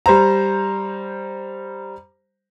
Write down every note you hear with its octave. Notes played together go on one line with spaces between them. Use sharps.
G3 C5 A#5